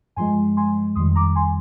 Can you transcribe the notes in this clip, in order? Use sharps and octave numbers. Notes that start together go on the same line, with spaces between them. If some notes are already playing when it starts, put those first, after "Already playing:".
G2 F3 G#3 G#5 C6
G#5 C6
F2 D#3 G3 C6 D#6
A#5 D6
G#5 C6